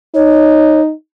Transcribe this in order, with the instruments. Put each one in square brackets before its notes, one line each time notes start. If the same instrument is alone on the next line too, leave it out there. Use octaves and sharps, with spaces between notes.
[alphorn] D#4 [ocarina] C#5